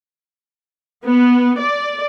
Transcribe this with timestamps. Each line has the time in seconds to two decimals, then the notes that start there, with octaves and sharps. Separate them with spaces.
1.05 B3
1.59 D5